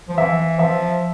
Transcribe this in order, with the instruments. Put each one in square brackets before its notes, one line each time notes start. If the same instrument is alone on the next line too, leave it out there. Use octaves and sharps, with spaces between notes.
[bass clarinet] F3
[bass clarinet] E3 [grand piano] E5
[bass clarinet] F3 [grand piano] E5